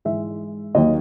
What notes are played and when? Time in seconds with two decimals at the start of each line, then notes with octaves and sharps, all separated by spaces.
0.05 G#2 E3 G#3 E5
0.75 D#2 D#3 F#3 D#5